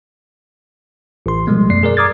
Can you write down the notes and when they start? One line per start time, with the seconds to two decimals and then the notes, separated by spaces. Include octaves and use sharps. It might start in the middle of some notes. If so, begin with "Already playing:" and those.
1.26 A1 C6
1.47 B2 F3 G3 G#3 B3
1.70 F#2 A3 D5 C7
1.83 G#4 A#4 D5
1.97 A#5 D6 D#6 F6 G#6 A6